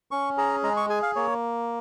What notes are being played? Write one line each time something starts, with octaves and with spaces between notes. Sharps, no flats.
C#4 C#6
G#4 A#5
G#3 A#5
C#6
G#4 G#5
F5
A#3 C#5